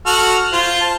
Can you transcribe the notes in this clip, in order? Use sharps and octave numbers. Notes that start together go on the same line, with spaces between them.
F#4 A4 F6
F4 C5
A5